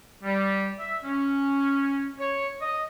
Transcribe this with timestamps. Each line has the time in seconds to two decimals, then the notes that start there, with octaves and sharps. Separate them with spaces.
0.24 G3
0.80 E5
1.04 C#4
2.20 C#5
2.62 D#5